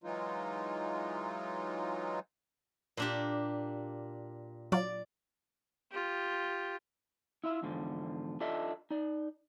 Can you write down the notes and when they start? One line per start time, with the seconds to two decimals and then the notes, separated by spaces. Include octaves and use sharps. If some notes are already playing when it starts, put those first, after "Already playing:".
0.04 E3 F#3 G#3 D#4 F4
2.97 A#2 D4 G4
4.72 F#3 F4 D5
5.91 F4 G4
7.44 E4 F4 E5
7.62 E2 G#2 D3 F3
8.41 D4 F4 A4 D#5 E5
8.91 D#4 D5